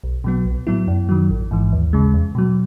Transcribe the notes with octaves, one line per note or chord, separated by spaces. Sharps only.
B1
B2 F#3 B3
B1
A2 F#3 B3 E4
F#2
D#3 F#3
A1
G#2 E3
D#2
C#3 G#3
E2
B2 F#3